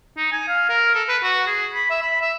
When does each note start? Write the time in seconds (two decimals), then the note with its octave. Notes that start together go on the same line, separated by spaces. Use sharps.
0.17 D#4
0.32 G#5
0.48 F5
0.69 A#4
0.95 A4
1.08 B4
1.23 F#4
1.47 G#4
1.73 B5
1.90 E5
2.02 B5
2.22 E5